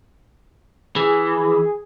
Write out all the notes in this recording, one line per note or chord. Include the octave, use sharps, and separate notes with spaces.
E3 G#4